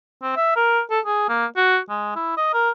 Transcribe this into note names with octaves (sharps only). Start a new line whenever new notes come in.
C4
E5
A#4
A4
G#4
A#3
F#4
G#3
E4
D#5
A#4